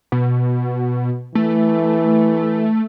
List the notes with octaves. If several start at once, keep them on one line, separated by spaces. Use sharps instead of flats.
B2
E3 A3